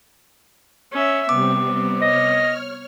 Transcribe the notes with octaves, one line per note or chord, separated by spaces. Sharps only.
C#4 E5
C3 G3 B3 C4 D6
C#5 D#5 F6